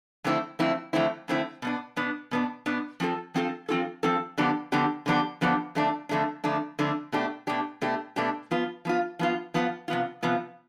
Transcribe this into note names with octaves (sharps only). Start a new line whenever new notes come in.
F2 D3 A3 C4 E4
F2 D3 A3 C4 E4
F2 D3 A3 C4 E4
F2 D3 A3 C4 E4
B2 B3 D4
B2 B3 D4
B2 B3 D4
B2 B3 D4
F3 C4 F4 A4
F3 C4 F4 A4
F3 C4 F4 A4
F3 C4 F4 A4
D3 F3 B3 D4 G4
D3 F3 B3 D4 G4
D3 F3 B3 D4 G4
D3 F3 B3 D4 G4
F2 D3 A3 D4
F2 D3 A3 D4
F2 D3 A3 D4
F2 D3 A3 D4
B2 A3 D4 G4
B2 A3 D4 G4
B2 A3 D4 G4
B2 A3 D4 G4
F3 B3 F4
F3 B3 F4
F3 B3 F4
F3 B3 F4
C3 F3 B3 F4
C3 F3 B3 F4